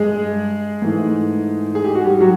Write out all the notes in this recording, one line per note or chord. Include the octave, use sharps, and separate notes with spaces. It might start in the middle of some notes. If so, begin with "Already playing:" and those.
Already playing: G2 G#3 G#4
G#2 E3 A3
G#4
G4
F#4
G3 G4
F#3 F#4